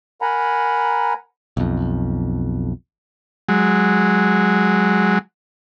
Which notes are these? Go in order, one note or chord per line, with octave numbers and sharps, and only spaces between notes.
A#4 F#5 G#5 A#5 B5
B1 F2
F#3 G#3